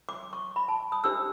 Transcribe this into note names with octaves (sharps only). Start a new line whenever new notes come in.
D6
C#6
B5
A5
D#6
D4 G4 C5 E6